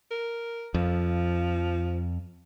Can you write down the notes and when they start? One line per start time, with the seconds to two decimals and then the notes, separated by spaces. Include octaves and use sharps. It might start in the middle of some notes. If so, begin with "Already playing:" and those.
0.11 A#4
0.74 F2 F3